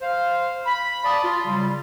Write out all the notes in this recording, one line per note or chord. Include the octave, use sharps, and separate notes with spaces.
C5 F5
B5
D5 F5 A5 D#6
F4
C#3 F#3 G3